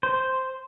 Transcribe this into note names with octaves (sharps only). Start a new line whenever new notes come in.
C5